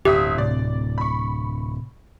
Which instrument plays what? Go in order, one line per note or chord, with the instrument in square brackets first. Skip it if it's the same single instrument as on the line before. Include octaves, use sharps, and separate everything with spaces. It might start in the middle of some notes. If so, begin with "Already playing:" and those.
[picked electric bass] D1 [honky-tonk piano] G1 E5 D#6 [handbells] G4
[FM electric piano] A2 C3 [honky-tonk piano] D5
[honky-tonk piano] B5 C#6